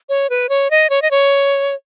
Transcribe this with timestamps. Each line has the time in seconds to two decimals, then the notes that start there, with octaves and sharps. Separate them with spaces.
0.09 C#5
0.30 B4
0.49 C#5
0.71 D#5
0.90 C#5
1.02 D#5
1.11 C#5